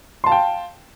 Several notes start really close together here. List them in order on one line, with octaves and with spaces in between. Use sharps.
C6 A5 F5 G5